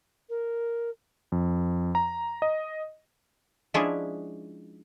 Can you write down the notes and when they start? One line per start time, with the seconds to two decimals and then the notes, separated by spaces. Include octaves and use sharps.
0.29 A#4
1.32 F2
1.95 A#5
2.42 D#5
3.74 F3 G#3 C#4 D4 E4 G#4